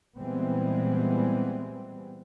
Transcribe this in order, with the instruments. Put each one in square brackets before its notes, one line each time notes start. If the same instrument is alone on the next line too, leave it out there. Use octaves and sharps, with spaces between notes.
[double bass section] A#2 E3 G3 G#3 B3 C4